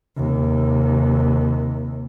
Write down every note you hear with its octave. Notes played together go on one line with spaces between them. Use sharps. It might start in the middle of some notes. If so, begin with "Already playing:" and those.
D#2 C3